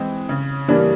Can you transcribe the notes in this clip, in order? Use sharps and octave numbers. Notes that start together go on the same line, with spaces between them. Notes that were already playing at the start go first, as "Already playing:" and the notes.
Already playing: E3 G#3 C4
C#3
E3 G3 A#3 D4